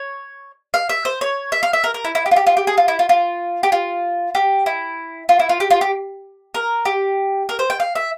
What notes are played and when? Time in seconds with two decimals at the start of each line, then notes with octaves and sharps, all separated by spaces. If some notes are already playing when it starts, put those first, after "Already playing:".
Already playing: C#5
0.74 F5
0.89 E5
1.05 C5
1.21 C#5
1.52 E5
1.63 F5
1.73 E5
1.84 A#4
1.94 A#4
2.05 E4
2.15 E4
2.26 G4
2.31 F4
2.36 G4
2.47 F4
2.57 G4
2.67 G#4
2.78 F4
2.88 E4
2.99 F4
3.09 F4
3.63 G4
3.72 F4
4.35 G4
4.66 E4
5.29 F4
5.39 E4
5.49 F4
5.60 G4
5.71 F4
5.81 G4
6.54 A#4
6.85 G4
7.49 A#4
7.59 C5
7.70 G5
7.80 F5
7.95 E5